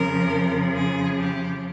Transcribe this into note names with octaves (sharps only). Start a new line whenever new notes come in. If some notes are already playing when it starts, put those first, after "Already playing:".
Already playing: F2 C#3 F3 A#4
G#4
G4